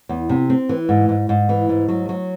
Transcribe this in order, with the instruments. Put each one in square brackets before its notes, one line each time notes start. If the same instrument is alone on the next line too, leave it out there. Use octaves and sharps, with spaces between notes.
[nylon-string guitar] E2
C3
C4
E3
G#2
G#2
G#2
E3
G#2
F#3
F#3